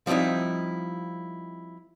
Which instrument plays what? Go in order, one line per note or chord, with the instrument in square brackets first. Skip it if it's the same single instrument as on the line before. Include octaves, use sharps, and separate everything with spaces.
[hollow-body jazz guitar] F3 G3 C4 D#4 E4